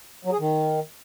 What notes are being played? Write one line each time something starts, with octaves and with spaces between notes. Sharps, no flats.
F#3
G#4
D#3